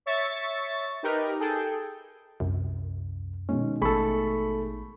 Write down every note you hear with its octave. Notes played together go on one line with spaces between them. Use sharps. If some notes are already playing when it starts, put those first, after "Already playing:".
C#5 E5 C#6 A6
D#4 G4 A#4 B4
G#4 A4 G5
C2 F#2
B2 D#3 G#3 C#4
A1 A3 G#4 A4 B5 C#6